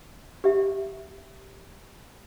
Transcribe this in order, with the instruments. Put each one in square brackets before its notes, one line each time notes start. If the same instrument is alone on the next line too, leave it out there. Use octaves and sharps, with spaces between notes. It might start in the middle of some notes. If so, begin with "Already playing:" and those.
[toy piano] G4 E5